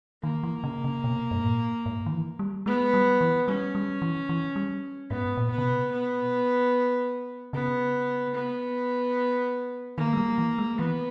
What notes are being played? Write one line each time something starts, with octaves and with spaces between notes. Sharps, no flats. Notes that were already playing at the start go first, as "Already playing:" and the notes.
D#3 A#3
E3
C#3
C#3
B2
G2
G#2
A#2
G#2
D#3
E3
G3
G#3 B3
G3
E3
G3 C#4
G3
E3
E3
G3
G#2 B3
A#2
B3
C#3
B2
B3
C#3 B3
B3
D#3 A#3
G#3
G3
E3
G#3
E3 B3